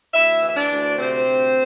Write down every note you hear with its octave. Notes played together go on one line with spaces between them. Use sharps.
D2 E4 E5
E3
E5
D4 D5
D2
C3 C4 C5
D2